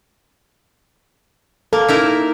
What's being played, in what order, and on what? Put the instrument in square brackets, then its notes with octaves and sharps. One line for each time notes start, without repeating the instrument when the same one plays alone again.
[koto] A#3 [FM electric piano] A4
[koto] D#4 E4 A#4